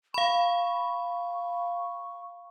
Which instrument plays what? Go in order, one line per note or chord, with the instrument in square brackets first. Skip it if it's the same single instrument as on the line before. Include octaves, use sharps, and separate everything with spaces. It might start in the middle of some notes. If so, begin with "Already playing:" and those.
[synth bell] F5 B5 [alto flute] C#6